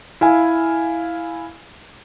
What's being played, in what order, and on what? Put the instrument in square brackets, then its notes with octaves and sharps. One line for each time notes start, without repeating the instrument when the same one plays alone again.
[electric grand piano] E4 F5 G#5